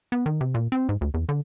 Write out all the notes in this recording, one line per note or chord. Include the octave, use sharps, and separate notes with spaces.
B3
D#3
C3
A#2
C4
G#2
D2
E2
D3